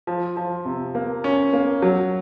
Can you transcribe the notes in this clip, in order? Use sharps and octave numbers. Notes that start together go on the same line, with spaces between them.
F3
F3
C3
A#3
C#4
A#3
F#3